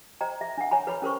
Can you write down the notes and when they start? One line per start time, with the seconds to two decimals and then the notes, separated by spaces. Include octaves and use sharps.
0.21 C5 D#5 G5 A#5
0.41 E5
0.58 D4 F#5
0.71 C#5 E5 G#5 A#5 B5
0.87 B4 C#5 B5
1.02 C#4 A#4 C5 C#6